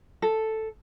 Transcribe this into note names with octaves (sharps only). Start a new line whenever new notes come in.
A4